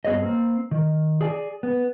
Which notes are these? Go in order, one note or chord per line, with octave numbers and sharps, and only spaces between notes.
G2 B3 G#4 C#5 D#5
A#3 C4
D#3
G#4 D5 G#5
B3